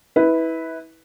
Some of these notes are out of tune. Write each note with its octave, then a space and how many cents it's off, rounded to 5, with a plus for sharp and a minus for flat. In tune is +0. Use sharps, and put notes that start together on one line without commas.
E4 -25 B4 +0